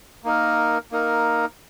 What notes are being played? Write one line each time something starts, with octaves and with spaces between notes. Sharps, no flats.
A#3 D#4 A#4
A#3 D#4 A#4